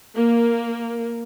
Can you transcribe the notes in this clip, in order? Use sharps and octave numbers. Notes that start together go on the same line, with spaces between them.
A#3